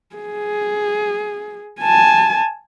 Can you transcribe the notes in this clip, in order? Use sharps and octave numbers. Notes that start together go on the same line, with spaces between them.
G#4
G#5 A5